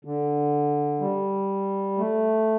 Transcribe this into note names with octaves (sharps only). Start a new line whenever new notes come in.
D3
G3
A3